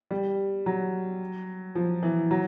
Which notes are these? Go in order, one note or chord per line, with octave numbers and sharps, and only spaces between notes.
G3
F#3
F3
E3
F#3